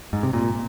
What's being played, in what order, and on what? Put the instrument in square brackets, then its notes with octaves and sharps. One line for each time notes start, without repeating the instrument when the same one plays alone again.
[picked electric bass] G#2
C3
A#2